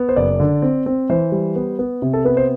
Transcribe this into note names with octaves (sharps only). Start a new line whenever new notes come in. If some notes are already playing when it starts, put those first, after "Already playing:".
Already playing: B3
C5
F#1 D5
D3
C4
C4
E3 C5
G3
B3
B3
C3
A4
B3 B4
C5